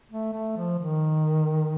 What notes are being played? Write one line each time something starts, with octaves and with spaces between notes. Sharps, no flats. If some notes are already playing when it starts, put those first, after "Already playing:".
A3
A3
F3
D#3